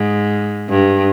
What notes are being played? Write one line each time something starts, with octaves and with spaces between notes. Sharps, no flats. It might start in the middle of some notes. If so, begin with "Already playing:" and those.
Already playing: G#2
G2